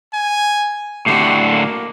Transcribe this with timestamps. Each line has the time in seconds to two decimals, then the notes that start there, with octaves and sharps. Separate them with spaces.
0.13 G#5
1.06 A2 D3 F#4 G4
1.51 A#3